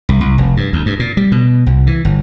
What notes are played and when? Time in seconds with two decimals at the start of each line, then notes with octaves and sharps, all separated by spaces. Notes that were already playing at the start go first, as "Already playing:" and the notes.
0.09 C2
0.21 C2
0.38 F1
0.57 G2
0.73 D2
0.86 G2
0.99 A#2
1.17 G3
1.32 B2
1.66 C2
1.87 E3
2.05 G1